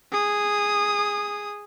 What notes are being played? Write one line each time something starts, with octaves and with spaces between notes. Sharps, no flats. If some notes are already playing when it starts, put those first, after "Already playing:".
G#4 D#6